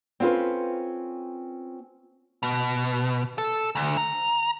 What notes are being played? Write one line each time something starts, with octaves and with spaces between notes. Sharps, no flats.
C4 C#4 F4 A4 B4
B2
A4
D2
A#5